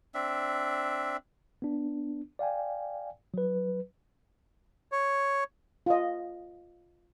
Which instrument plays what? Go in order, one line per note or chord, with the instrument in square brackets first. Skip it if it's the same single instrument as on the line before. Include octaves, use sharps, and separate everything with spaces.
[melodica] C4 D4 E5
[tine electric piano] B3 D4
D5 F5 G5 G#5
F#3 B4
[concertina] C#5
[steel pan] F4 D#5